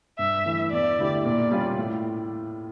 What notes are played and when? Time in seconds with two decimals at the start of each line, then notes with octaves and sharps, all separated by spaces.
0.19 G2 E5
0.45 E3 A3
0.71 E2 D5
0.99 D3 A3 E4 G4
1.24 A#2 D5
1.51 G3 C#4 F4
1.78 A2